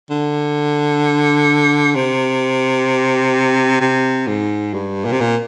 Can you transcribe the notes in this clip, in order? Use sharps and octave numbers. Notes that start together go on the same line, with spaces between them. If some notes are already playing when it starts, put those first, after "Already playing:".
D3
C3
C3
G#2
G2
A#2
C3
A#2